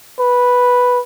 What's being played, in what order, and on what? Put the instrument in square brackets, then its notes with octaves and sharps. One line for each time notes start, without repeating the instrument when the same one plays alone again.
[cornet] B4